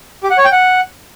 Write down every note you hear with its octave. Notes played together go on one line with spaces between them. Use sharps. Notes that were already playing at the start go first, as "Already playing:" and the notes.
G4
F#5
C#5
G5
F#5